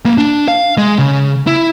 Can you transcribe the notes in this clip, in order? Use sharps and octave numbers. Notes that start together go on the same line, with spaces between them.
A#3 B4
D4
F5
G#3
C#3
E4